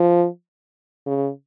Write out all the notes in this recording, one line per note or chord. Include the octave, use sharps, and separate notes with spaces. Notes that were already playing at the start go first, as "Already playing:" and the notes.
Already playing: F3
C#3